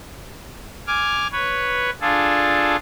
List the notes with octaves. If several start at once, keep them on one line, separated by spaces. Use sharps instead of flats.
G#5 D6 F6
B4 C#5
D4 F4 G#4 A4